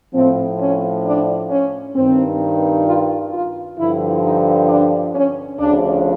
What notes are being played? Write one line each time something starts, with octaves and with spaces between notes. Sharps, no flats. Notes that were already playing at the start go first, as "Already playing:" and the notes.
A2 F3 C4
C#4
D4
C#4
G2 D#3 C4
F4
F4
G2 D3 F3 E4
D#4
D4
C#4
D2 C#3 F3 D4